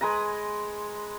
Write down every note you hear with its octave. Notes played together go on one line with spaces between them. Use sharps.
G#3 B4 G#5 A#5